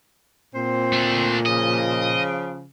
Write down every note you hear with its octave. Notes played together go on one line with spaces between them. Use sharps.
A#2 C4 C5
A3 D4
C#3 F3 D#5